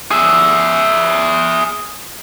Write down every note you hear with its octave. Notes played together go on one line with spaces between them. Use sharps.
G#4 E5